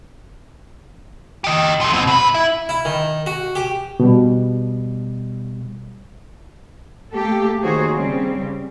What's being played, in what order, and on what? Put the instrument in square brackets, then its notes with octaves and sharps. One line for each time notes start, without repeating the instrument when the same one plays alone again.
[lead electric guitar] G4 D#5
F3 A3
B2 C4
B2 B4
E4
[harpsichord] E4
D#3
F#4
G4
[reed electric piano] B2 G3
[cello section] A3 A#3 G4 A4
D#3 A#3 F#4 G#4 C5 C#5
C#3 G3 C4